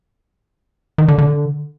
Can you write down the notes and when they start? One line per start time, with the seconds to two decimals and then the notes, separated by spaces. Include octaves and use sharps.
0.98 D#3
1.08 D3
1.18 D3